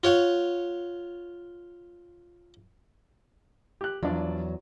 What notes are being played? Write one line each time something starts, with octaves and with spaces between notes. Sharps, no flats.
F4 C#5 F#5 C#6
G4 F#6
E2 F3 F#3 D4 D5